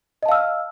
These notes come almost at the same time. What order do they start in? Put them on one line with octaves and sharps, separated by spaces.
D#5 A5 F5 E6 F6